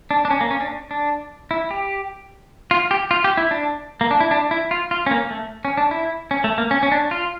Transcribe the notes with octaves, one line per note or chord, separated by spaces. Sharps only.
D4
D4
C#4
A#3
C#4
D4
D4
E4
G4
F4
G4
F4
G4
E4
D4
A#3
D4
E4
D4
E4
F4
F4
C#4
A#3
A3
C#4
D4
E4
C#4
A3
A#3
C#4
C#4
D4
F4